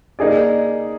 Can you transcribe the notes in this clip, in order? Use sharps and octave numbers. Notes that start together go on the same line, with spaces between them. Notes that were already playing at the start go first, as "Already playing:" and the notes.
A#3 D#4 G#4 D5